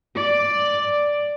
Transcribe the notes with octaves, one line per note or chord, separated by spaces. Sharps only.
D5